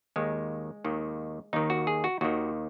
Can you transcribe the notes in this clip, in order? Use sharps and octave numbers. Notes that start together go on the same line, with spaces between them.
D#2 D#3 G#3
D#2 D#3
D#2 D#3 D#4
F#4
G#4
F#4
D#2 D#3 F#4